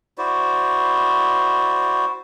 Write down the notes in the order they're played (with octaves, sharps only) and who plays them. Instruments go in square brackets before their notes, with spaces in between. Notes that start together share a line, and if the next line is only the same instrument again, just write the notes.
[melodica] E4 F#4 C5 D5